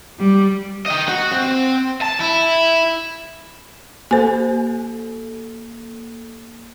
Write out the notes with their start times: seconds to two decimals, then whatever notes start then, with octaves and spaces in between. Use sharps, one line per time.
0.19 G3
0.86 D#5 G5
1.08 F#4
1.32 C4
2.01 A5
2.20 E4
4.11 A#3 A4 C5 G#5